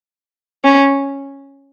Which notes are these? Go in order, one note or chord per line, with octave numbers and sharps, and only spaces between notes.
C#4